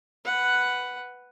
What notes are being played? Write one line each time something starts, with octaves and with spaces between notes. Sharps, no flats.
B4 F#5